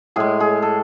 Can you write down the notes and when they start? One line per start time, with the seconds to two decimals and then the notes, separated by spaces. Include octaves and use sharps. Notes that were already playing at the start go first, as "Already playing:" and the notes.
0.16 A2 G#3 G#4
0.40 G#4
0.62 A4